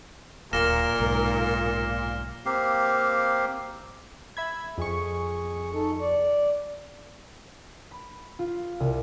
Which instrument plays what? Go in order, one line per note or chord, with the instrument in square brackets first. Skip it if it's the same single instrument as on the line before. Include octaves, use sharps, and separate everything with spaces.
[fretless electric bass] D1 [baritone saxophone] A#2 [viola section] A#4 [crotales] F6 A#6 E7
[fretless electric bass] B1 G#2
[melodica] A#3 C4 G4 F5
[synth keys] E5 B5 G#6
[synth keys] F2 C#6 [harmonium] G#4
[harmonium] D#4 A4
D5
[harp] B5
F4
C2